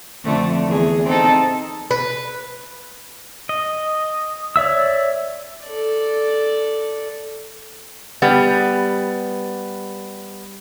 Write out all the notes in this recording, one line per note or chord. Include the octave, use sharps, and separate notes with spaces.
F2 D3 A3
E2 G#4
C4 D#4 A4
B4
D#5
C#5 D5 E5 E6
A4 D5
G3 B3